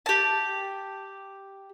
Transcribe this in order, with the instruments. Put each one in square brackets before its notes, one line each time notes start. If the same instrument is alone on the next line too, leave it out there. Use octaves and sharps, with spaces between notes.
[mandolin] G4 A5